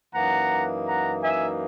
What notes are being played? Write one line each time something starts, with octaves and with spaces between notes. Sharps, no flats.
F#2 E3 A#3 D#4 F#5 A#5
F#5 A#5
E5 G#5